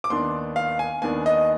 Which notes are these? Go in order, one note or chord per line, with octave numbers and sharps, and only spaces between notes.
D6
D#2 D#3 B3 D4 C6
F5
G#5
D#2 D#3 B3 D4 G#5
D#5